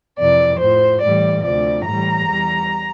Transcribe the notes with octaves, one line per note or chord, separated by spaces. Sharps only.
F2 C3 E3 D5
A2 F3 C5
A2 E3 G3 D5
D2 C3 F3 D5
A2 E3 G3 A#5
E2 E3 G3